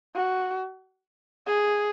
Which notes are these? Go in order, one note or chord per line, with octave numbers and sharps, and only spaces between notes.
F#4
G#4